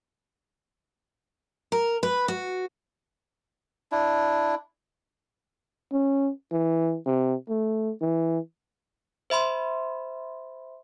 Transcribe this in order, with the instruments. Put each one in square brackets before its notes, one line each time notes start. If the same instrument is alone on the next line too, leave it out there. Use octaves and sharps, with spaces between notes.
[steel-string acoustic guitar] A#4
B4
F#4
[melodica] D4 E4
[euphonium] C#4
E3
C3
A3
E3
[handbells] C5 E5 B5 C6